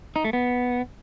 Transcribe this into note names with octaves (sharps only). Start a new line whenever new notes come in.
D#4
A3
B3